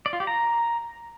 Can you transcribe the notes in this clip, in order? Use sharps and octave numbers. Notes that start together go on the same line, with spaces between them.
D5
F4
G4
A#5